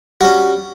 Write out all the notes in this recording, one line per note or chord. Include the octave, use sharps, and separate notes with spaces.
G3 C#4 F#4